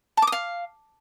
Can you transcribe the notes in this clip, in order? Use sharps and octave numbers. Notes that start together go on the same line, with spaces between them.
A5
D6
D#6
F5